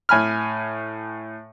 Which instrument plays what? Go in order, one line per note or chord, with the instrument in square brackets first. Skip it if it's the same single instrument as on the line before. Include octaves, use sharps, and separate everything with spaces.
[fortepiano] A2 G#5 B5 F6